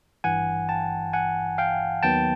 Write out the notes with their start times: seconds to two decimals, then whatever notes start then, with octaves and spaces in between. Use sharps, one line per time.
0.24 G#1 G2 E3 F#5 G#5
0.69 G5 A5
1.13 F#5 G#5
1.58 F5 G5
2.03 D#2 D#3 F#3 B3 G5 A5